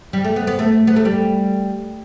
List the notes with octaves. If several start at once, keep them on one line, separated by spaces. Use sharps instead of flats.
G3
A3
B3
B3
A3
B3
A3
G3